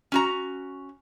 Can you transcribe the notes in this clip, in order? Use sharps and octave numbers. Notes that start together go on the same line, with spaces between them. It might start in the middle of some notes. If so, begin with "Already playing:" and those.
C#4 F#4 A#5